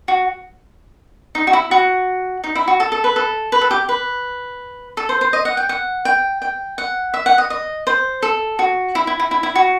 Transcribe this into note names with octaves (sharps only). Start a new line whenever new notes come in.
F#4
D#4
F#4
E4
F#4
D#4
E4
F#4
A4
A4
B4
A4
B4
A4
G4
B4
A4
C5
C5
D#5
F#5
G5
F#5
G5
G5
F#5
E5
F#5
D#5
D#5
C5
A4
F#4
E4
E4
E4
E4
E4
F#4